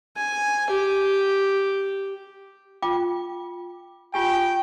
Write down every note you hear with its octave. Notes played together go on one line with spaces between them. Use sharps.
G#5
G4
F4 G5 D6
F4 G4 G5 G#5